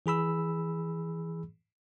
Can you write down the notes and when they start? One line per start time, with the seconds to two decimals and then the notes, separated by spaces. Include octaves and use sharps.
0.06 E3 G#4 B5 E6